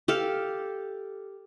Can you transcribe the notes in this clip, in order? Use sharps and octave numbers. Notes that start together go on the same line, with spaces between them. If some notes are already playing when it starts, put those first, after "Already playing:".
G4 A4 F5